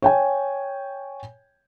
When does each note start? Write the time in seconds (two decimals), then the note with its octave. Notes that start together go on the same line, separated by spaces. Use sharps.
0.02 C#5 G5 G#5